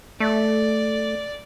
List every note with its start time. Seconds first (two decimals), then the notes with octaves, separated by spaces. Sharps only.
0.20 A3 D5